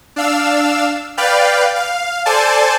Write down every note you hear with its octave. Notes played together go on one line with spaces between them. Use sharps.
D4 F5 E6
B4 D5 F5 G5
F5
A4 C5 D5 G#5 A5